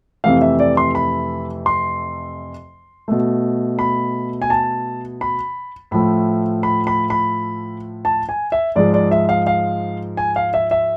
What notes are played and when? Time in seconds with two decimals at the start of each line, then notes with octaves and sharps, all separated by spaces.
0.24 F2 C3 E3 A3 F5
0.42 E5
0.60 D5
0.77 C6
0.95 B5
1.66 C6
3.08 B2 A3
3.79 B5
4.42 G#5
4.50 A5
5.21 B5
5.91 A2 F3 A3 B5
6.63 B5
6.87 B5
7.10 B5
8.05 A5
8.29 G#5
8.52 E5
8.76 G#2 F3 G#3 D5
8.94 D5
9.11 E5
9.29 F5
9.47 F5
10.17 G#5
10.36 F5
10.54 E5
10.71 E5